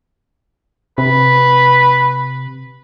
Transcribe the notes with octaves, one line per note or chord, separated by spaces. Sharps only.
C3 B4